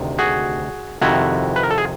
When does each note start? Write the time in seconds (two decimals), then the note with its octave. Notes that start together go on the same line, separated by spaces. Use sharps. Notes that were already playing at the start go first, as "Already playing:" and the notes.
Already playing: D2 C3 D#3
0.19 F#4 G#4
1.01 F2 C3 D#3 E4 F#4
1.56 B4
1.63 A#4
1.71 A4
1.78 G#4